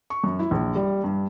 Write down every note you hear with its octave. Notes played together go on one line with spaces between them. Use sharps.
C#6
F#2
E4
A#1
G3
G2